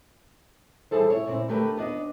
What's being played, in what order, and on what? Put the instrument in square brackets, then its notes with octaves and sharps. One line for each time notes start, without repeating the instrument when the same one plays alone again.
[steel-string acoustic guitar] E3 G3 E4 G#4 A4 C5
E4 C#5
A#2 C4 E4
D3 A3 G4 A#4 B4
D#2 B3 D4 D#5